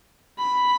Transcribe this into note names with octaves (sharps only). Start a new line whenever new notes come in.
B5